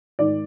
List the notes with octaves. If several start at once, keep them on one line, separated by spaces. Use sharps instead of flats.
G#2 D#3 D5